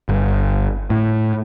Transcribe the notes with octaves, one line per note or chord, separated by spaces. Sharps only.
G1
A2